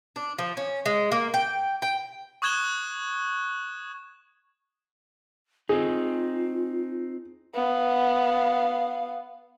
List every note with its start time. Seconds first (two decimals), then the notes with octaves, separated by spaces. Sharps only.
0.16 D4
0.39 F3
0.57 C#4
0.86 G#3
1.12 A#3
1.34 G5
1.82 G5
2.42 C#6 D#6 F#6 G#6 E7 G7
5.69 C4 D#4 F4 G#4
7.55 B3 F5